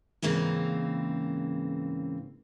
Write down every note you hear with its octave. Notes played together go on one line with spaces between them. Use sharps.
G#2 C#3 E3 A#3 C4